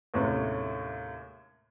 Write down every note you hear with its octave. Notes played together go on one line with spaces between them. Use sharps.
D#2 A2 C3 G#3 C#4